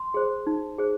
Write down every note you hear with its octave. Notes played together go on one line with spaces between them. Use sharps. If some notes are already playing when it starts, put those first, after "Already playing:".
Already playing: C6
G#4 C5
D#4
G#4 C5